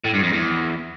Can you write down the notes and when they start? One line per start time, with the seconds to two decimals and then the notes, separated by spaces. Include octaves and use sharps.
0.04 A2
0.14 G2
0.23 F2
0.32 E2